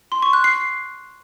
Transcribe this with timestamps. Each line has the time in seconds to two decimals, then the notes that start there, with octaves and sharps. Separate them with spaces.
0.12 C6
0.22 C#6
0.33 F#6
0.44 C7